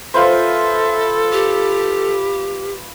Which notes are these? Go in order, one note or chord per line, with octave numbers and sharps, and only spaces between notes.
F4 A4 B4 C5 E5
G4